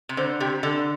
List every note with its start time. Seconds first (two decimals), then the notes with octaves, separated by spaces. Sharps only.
0.09 C3
0.17 D3 C5
0.40 C3 G4
0.63 D3 A4